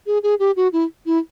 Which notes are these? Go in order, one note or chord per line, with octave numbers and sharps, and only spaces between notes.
G#4
G#4
G4
F#4
E4
E4